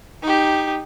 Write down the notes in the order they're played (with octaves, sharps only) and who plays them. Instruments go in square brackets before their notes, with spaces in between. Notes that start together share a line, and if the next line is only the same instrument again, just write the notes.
[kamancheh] D#4 G4